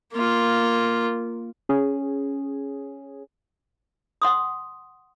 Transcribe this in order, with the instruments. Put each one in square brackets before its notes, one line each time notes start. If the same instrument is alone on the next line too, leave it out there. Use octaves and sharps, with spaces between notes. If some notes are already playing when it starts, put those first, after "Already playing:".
[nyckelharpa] A#3 F4
[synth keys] C#4 G#4
[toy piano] F#5 C6 D#6